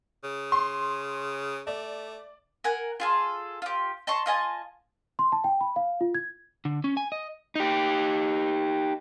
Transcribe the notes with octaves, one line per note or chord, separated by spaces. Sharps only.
C#3
C6
A3 D5
A#4 F#5 G#5
F4 G#4 A4
F4 G4
D#5 A5 C6 C#6
F4 D#5 G#5 A5
C6
A5
G5
B5
F5
F4
G#6
D3
C#4
G#5
D#5
D#4 G4